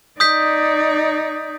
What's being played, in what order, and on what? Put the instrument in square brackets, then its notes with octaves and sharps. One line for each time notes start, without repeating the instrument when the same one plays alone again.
[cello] D#4 D5 [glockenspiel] D#6 G6 B6